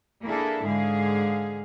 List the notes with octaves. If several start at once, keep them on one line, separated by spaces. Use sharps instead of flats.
A#3 D4 E4 G#4 A4
G#2 D3 G#4 F5